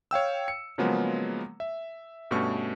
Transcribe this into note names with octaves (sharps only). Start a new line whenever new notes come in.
C#5 F5 G5 E6
C#7
C#3 F3 F#3 G#3 A#3 B3
E5
G2 B2 A3 C#4 C#6